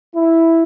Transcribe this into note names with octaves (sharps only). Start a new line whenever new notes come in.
E4